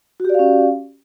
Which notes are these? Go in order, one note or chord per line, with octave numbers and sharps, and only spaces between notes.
C#4 F#4 G4 D5 F5